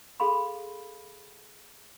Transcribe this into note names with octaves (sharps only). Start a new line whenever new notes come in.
G#4 A4 F5 B5 C6